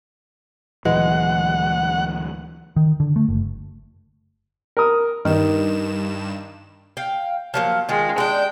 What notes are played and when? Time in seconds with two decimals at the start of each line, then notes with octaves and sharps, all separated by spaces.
0.85 D2 A#2 E3 F#3 G#3 F#5
2.76 D#3
3.00 D3
3.16 A3
3.28 F#1
4.77 A#4 D#6
5.25 G2 D#3 E7
6.97 F5 G5
7.54 F3 F#3 A#3
7.89 D#3 G#3 F4
8.18 G#3 D4 G5